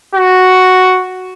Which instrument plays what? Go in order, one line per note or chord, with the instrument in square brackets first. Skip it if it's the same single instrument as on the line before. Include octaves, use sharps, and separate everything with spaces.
[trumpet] F#4